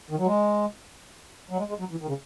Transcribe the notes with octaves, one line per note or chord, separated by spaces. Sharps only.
D#3
F#3
G#3
F#3
G#3
G#3
F#3
E3
D#3
C#3